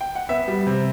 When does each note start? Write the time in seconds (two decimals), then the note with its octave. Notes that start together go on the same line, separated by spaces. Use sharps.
0.01 G5
0.15 F#5
0.29 B3 E5
0.48 G3
0.67 C3